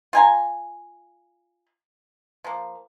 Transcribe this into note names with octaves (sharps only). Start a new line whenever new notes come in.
F4 G#5 A#5
F3 A#3